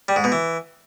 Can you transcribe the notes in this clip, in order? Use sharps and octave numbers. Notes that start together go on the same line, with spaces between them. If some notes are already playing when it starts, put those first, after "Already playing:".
G3
G#2
B2
E3